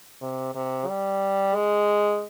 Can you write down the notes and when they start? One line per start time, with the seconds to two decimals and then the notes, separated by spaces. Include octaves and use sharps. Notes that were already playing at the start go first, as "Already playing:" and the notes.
0.22 C3
0.55 C3
0.87 G3
1.55 G#3